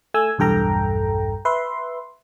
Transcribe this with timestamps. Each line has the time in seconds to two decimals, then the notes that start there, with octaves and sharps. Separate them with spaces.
0.14 A3 G#5 E6
0.38 B1 E2 G2 A4 G5 A#5
1.45 B4 E5 C6